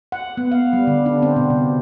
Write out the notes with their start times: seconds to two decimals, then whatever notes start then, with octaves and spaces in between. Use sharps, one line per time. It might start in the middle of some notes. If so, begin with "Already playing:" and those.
0.12 F#5
0.37 B3
0.52 F5
0.73 G3
0.87 D3
1.06 D4
1.22 C4
1.36 B2
1.50 C3